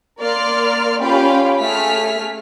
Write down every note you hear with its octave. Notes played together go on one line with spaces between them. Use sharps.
A#3 A#4 D5 C6 F6
C#4 F4 G4 F5 G5 B5
A3 G#4 F6 B6